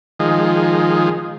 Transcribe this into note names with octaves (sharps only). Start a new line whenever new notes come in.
D#3 F3 G#3